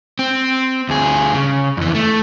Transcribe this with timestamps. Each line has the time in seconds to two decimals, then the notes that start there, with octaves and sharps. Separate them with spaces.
0.19 C4
0.89 D2 G#4
1.34 C#3
1.77 F2 E3
1.95 A3